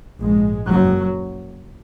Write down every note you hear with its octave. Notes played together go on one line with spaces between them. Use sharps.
A#1 G#2 G#3
F#1 F#2 F#3